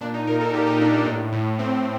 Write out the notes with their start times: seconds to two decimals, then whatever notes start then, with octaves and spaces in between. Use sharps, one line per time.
0.01 A#2 D4
0.14 D#4
0.27 A#2 A#4
0.40 A4
0.53 A#2 G4
0.67 D#4
0.80 A#2 D4
0.93 D4
1.06 A2
1.32 A2
1.59 A2 C4